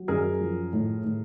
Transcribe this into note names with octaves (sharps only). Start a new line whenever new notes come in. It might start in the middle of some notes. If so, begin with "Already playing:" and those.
Already playing: F#3
F#2 G#4 A#4
F3
A2
A2